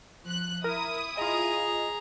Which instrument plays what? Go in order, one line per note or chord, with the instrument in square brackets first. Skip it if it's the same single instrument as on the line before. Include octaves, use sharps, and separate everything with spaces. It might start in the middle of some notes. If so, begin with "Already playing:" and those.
[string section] F3 F#6
[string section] E4 D#6 [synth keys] A#4
[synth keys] F4 D#5 [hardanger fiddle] G#4 A#5